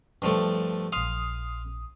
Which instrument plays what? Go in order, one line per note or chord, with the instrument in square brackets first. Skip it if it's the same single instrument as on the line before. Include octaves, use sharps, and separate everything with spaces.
[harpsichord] G2 F3 A3
[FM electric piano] A#1 D#6 [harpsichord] F5 C6